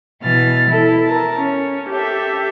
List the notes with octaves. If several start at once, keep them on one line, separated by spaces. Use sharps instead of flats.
B2 E3 F6 A6
E4 A4
A#4 A5
C#4
G4 A4 E5